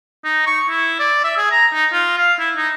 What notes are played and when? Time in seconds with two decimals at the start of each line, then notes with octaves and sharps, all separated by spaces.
0.24 D#4
0.46 C#6
0.69 E4
0.99 D5
1.24 E5
1.37 G#4
1.51 A#5
1.73 D#4
1.92 F4
2.18 F5
2.39 E4
2.57 D#4